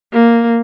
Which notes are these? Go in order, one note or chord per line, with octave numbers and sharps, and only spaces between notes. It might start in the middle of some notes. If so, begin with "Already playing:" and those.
A#3